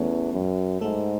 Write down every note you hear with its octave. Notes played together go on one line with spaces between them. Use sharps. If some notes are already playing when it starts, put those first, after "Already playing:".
Already playing: E2 A3 B3 C#4 A4 B4 C#5
F#2
G#2 A3 A4